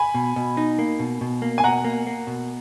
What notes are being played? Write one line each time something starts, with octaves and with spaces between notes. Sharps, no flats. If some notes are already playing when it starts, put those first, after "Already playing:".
Already playing: G#5 B5
B2
B2
D#4
A#3
B2
B2
A#3
G#5
B2 F#5 A#5
A#3
A#3
B2